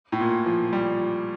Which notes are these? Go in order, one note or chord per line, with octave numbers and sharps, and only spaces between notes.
A2
A#2
F3
G3